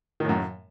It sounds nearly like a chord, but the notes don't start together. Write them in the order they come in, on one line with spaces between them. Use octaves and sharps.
D#3 A2 F#2